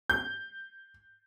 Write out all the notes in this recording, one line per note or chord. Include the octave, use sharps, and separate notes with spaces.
G6